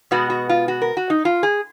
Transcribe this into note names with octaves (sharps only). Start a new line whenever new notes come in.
B2 G#3 B3 F#4
F#4
F4
F#4
A#4
F#4
D#4
F4
G#4